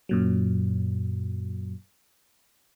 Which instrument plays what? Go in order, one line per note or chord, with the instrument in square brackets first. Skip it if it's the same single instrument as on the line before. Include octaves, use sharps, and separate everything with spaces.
[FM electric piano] F#2 A#2 F#3